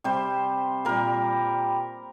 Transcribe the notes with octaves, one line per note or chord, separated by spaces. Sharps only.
C3 G3 C5
A#2 G3 A#4